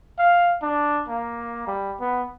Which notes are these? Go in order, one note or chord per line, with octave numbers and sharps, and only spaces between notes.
F5
D4
A#3
G3
B3